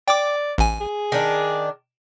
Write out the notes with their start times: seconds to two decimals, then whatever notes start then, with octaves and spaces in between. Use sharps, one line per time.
0.08 D5 G5 D6
0.58 A1 G#5
0.81 G#4
1.12 D#3 D4